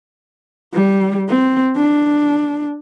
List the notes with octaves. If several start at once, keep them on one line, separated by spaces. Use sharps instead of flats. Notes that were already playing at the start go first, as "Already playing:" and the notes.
G3
C4
D4